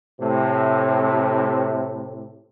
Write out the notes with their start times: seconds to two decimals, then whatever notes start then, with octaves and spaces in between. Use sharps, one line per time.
0.20 A2 C3